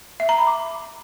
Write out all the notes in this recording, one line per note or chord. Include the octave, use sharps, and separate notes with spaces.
E5
A#5
B5
D6